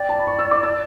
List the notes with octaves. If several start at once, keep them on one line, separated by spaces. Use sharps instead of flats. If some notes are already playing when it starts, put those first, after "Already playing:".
Already playing: D5 G5
A5
B5
C#6
E6
D6
E6